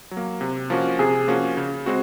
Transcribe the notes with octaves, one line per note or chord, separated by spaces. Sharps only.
F#3
A#3
C3
F3 A#3 C#4 F#4
C3 G#4
F3 A#3 C#4 F#4
C#3
G#3 C4 F#4